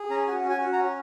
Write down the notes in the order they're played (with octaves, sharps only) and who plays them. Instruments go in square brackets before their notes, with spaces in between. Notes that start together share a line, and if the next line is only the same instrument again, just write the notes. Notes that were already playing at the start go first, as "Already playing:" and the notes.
Already playing: [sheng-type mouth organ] G#4
C#4 A#5
F#4 G#5
C#4
G#5
F#4
A#5
C#4